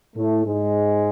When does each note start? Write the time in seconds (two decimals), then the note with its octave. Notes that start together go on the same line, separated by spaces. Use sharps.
0.16 A2 A3
0.45 G#2 G#3